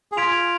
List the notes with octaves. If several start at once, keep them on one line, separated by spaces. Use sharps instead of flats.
G#4
F4 C6 G#6 B6 D7 F7